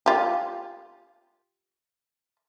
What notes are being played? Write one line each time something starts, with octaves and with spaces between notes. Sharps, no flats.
F4 G4